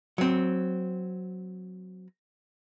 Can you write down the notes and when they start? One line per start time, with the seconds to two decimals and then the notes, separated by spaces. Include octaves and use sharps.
0.18 F#3 C4